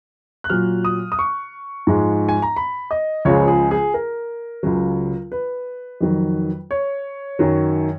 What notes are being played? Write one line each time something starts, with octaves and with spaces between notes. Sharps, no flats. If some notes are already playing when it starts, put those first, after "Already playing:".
F#6
A#2 F#3 F6
D#6
D#6
C#6
G#2 F3 G#3
G#5
A#5
B5
D#5
C#2 C#3 F3 G#3 C#5
G#4
G#4
A#4
C#2 C#3 F#3
B4
F2 D#3 F#3
C#5
F#2 D#3 F#3